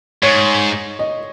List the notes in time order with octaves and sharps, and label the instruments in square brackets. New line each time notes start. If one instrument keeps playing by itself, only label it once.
[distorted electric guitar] G#2 [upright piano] C#5
[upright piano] D#5